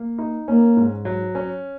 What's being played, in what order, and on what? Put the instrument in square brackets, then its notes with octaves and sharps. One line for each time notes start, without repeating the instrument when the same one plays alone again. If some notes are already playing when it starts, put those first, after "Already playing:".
Already playing: [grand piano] A#3
D#4
[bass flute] A#3 [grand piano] C#4
[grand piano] G#2
F#3
C#4